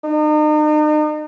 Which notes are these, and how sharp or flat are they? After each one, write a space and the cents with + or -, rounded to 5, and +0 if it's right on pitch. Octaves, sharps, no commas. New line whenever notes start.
D#4 -40